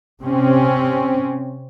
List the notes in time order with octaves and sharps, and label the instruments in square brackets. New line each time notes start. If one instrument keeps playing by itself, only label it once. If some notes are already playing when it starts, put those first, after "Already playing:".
[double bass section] C3 C4 C#4